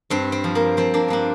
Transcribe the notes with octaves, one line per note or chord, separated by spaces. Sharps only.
G2 C4
C4
F3
A#3
F3 C4
A#3 D4
G2 A#3 D4